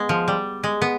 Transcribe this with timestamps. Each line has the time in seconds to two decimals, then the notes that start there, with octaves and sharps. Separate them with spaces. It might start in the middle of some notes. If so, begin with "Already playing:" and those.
Already playing: G#3 B3
0.09 F3
0.28 G3
0.64 G#3
0.82 B3